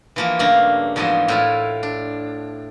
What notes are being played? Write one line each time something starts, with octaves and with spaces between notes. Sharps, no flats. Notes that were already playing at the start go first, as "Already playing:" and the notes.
E3 F3 A#3
G2 C#3 A3 A#3
E2 G#2 F3 F#4 C5 D#5
A2 E4 F4
D4